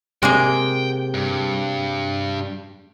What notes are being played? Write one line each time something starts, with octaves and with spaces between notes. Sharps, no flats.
C3 G#3 A#3 G#4 G5
G2